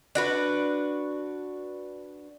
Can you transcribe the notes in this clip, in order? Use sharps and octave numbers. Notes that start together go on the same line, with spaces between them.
D4 F#4 B4